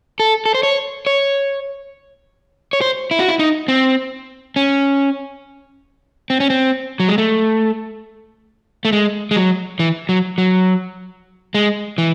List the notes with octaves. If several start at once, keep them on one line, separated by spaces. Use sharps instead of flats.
A4
A4
C5
C#5
C#5
C#5
C5
E4
F#4
E4
D#4
C4
C#4
C4
C#4
C4
F#3
G#3
A3
A3
G#3
G#3
F#3
E3
F#3
F#3
G#3
E3